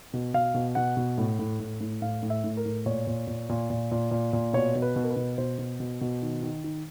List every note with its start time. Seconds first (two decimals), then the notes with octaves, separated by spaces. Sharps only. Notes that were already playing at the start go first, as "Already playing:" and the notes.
0.13 B2
0.34 B2 F5
0.54 B2
0.75 B2 F#5
0.97 B2
1.18 A2
1.39 A2
1.60 A2
1.81 A2
2.02 A2 F5
2.23 A2
2.30 E5
2.44 A2
2.57 A#4
2.65 A2
2.86 A#2 C#5
3.07 A#2
3.27 A#2
3.49 A#2
3.70 A#2
3.91 A#2
4.11 A#2
4.33 A#2
4.53 B2 C#5
4.75 B2
4.82 B4
4.96 B2
5.04 A#4
5.10 B4
5.16 B2
5.38 B2 C5
5.58 B2
5.80 B2
6.01 B2
6.22 D#3
6.43 D#3
6.64 D#3